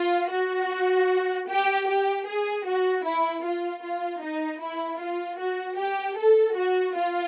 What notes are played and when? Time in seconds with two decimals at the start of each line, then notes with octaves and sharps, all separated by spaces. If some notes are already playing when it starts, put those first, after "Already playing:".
Already playing: F4
0.32 F#4
1.49 G4
1.88 G4
2.27 G#4
2.66 F#4
3.05 E4
3.45 F4
3.84 F4
4.23 D#4
4.62 E4
5.00 F4
5.39 F#4
5.78 G4
6.17 A4
6.56 F#4
6.96 F4